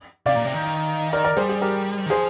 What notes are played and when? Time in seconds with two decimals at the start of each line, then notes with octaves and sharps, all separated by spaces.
0.26 C3 D5 F5
0.35 A#2
0.45 C3
0.54 D#3
1.13 A#4 D5
1.24 A#4 D5
1.36 G3 G#4 C5
1.49 G#4
1.61 G4 A#4
2.06 D#3
2.10 F3 G#4 C5